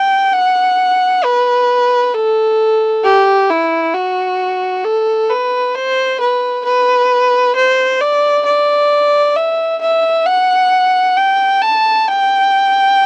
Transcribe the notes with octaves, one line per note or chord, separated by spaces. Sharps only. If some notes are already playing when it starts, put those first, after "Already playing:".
Already playing: G5
F#5
B4
A4
G4
E4
F#4
A4
B4
C5
B4
B4
C5
D5
D5
E5
E5
F#5
G5
A5
G5